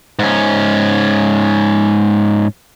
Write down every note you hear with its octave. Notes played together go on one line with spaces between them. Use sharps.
G#2 C#4